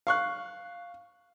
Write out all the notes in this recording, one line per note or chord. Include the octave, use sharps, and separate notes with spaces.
F5 C#6 F#6